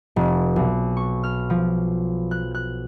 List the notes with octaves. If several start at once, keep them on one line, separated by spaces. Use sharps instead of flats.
F1
B1
C#6
F6
F3
F#6
F#6